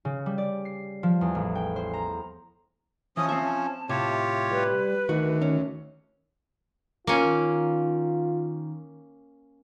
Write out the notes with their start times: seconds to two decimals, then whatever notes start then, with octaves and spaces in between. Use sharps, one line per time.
0.05 C#3
0.26 G3
0.38 D5
0.65 C7
1.03 F3
1.21 E2
1.35 A1
1.55 G5
1.76 C5
1.93 A#5
3.17 E3 F3 C#4 D#6
3.29 C4 E5 A5
3.89 A2 C3 F4 G4 C#5
4.51 G3 B4
5.09 D2 D#3 F#4
5.42 C#4
7.07 D#3 A#3 C#4 F4